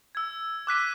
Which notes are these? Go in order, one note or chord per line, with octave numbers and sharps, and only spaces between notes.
E6 G#6
D6 F#6 B6 D#7